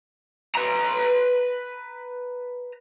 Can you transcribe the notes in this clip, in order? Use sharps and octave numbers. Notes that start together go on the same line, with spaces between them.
B4 A#5